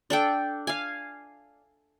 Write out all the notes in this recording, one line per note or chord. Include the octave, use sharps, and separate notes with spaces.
D4 A4 G5
F5 G#5